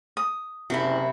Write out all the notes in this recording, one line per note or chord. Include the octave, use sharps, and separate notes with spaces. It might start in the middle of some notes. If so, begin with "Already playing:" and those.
D#6
F#1 C3 F#3 E4